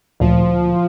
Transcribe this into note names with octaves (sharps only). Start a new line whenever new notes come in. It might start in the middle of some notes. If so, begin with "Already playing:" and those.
D2 A#2 F3